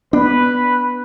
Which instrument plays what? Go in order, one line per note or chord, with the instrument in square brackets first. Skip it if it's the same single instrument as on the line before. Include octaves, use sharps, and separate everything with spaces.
[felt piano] B3 [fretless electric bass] D4 [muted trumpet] B4